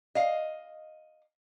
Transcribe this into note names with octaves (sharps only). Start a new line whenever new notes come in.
D#5 F5